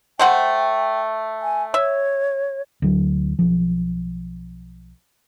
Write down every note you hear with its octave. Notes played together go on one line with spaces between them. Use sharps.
A3 C5 F#5 G5
G#5
C#5 E5
D2 F#3
B1 F3